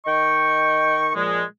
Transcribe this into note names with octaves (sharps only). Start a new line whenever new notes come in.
D#3 D#5 G5 C#6
A#2 F3 G#3